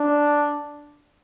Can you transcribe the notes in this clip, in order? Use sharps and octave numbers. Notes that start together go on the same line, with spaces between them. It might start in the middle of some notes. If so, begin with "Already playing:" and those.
Already playing: D4